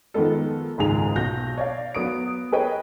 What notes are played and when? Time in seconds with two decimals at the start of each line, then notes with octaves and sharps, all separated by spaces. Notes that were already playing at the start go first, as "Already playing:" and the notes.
0.14 D#3 F3 G#3 B3 A4
0.78 F#1 C#2 G#2 D#3 G#4 F7
1.16 B1 F#4 G6 A#6
1.58 C#5 D5 F5
1.95 F#3 B3 D#6 D7
2.52 G#4 A#4 B4 C#5 D#5 G5